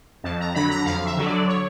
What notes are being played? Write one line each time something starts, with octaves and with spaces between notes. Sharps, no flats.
F2 A5
A#5
D3 F#3 B5
A#5
F2 F5
E5
D3 F#3
D5
C#5